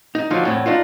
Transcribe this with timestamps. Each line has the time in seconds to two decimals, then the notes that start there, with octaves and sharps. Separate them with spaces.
0.15 D#4
0.30 D3 F3 F#3 D#4 F4
0.43 E2 A2 C4
0.66 D4 D#4 F4